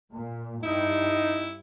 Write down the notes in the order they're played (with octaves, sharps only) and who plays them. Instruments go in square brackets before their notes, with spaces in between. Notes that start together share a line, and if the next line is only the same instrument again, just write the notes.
[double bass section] A#2
[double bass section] G2 [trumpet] D#4 [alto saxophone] E4